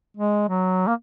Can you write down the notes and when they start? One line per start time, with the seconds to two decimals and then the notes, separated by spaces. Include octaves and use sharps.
0.17 G#3
0.49 F#3
0.88 A#3